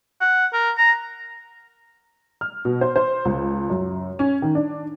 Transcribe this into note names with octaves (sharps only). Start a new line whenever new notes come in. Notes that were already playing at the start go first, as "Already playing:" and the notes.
F#5
A#4
A#5
F6
B2
C5
C5
C#2
F#2
C#4
D#3
D4